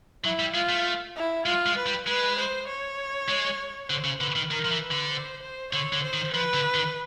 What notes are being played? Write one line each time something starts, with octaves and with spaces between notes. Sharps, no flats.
F#3 E4
G3
G#3 F4
A3
E4
G#3 F4
G#3
B4
G3
G#3 B4
C5
C#5
G#3
D3 C5
C#3
D3 B4
D#3
D#3 A#4
F3
E3
B4
D3
C5
C5
D3 C#5
D3
C5
D#3
F3 B4
D3
D#3